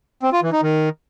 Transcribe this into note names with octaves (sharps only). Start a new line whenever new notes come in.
C4
F4
E3
D#4
D#3